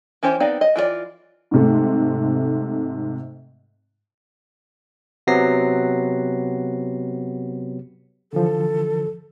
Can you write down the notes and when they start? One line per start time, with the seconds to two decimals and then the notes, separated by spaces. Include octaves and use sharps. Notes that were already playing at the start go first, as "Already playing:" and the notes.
0.23 E3 C#4 G4 C5
0.40 B3 C4 D#4 D5 F5
0.61 D#5
0.76 E3 F4 G#4 D5
1.51 G#2 C3 A3
5.27 C3 F#3 B3 A#6 C7
8.33 D3 E3 F3 A4